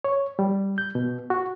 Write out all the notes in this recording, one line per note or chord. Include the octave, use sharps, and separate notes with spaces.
C#5
G3
G6
B2
F#4